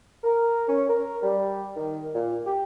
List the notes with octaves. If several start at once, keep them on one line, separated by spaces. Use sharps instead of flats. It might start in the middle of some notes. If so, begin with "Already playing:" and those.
A#4
C#4
A#4
G3
D#3
A#2
G4